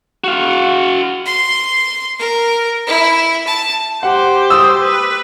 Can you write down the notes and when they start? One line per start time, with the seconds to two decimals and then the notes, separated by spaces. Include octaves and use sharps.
0.24 F#4 F5
1.26 C6
2.19 A#4
2.87 E4
3.47 A5
4.03 G4 C5 F#5
4.50 D#6 E6
4.82 B4